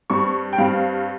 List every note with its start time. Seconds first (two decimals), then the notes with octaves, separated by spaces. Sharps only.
0.10 G2 G3 C4 C#6
0.53 G5
0.58 G2 G3 C4 F5